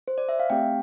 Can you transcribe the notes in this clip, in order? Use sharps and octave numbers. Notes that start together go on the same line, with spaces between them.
C5
D5
E5
F5
A3 C4 G4 G5